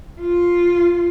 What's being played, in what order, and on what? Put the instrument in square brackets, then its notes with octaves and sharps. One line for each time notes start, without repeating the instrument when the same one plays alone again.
[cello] F4